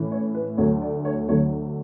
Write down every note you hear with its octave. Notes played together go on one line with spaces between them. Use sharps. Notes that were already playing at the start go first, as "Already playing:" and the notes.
Already playing: A2 E3 A3 C#4 E4
C#5
B4
D2 D3 F#3 A3 C#5
D5
C#5
D2 D3 F#3 A3 C#5